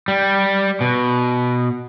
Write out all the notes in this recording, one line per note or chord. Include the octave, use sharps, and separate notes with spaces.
G3
B2